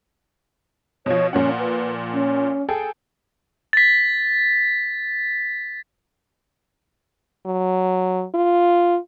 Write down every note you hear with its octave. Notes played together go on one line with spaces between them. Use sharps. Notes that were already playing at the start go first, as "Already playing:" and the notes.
B2 F3 C#5
A#2 F3 C#4 F#5
B4
C#4
G#4 A4 G5
A6 B6
F#3
F4